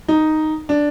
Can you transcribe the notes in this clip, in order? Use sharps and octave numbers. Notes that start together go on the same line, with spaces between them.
D#4
D4